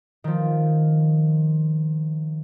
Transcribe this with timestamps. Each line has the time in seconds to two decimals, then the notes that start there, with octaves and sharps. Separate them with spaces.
0.24 D#3 F3